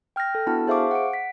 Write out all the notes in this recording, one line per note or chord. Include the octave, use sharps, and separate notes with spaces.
G5 F6 G6 A#6
A4
B3 D4 E4 F#4 A5
G#4 C5 E5 F5 C#6 D6
F#5 D7
B6